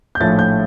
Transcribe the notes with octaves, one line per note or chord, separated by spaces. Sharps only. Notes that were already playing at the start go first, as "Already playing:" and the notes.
G6
A#1 A2 F3 A3 A6
G6